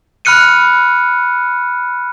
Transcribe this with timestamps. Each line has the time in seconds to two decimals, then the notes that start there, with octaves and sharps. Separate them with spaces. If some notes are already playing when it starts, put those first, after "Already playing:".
0.25 B5 F6 F#6 C#7 D#7